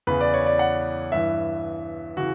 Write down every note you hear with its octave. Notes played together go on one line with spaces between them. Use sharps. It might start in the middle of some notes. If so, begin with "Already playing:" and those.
E2 C#3 E3 B4
D5
C#5
D5
F#5
G2 E3 E5
C#3 E3 F#4